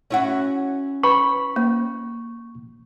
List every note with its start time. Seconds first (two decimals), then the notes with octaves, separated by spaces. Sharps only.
0.10 C#4 E4 F#4
1.04 B4 B5 C#6
1.56 A#3